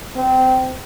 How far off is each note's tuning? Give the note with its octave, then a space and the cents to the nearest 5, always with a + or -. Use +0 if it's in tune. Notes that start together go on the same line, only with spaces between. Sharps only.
C4 -20